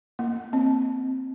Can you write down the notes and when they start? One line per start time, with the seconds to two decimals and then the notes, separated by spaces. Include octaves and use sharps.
0.19 A#3
0.53 C4